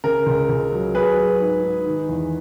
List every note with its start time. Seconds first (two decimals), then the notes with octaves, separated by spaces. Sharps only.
0.04 C#3 A#4
0.26 C#2
0.49 C#2
0.72 F#3
0.94 F#3 G#4 B4
1.17 F#3
1.40 G#2
1.63 G#2
1.86 D#3
2.09 E2